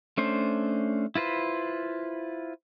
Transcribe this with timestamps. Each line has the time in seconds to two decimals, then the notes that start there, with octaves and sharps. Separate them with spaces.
0.18 A3 C#4 D4 C5
1.15 E4 F4 B4 C5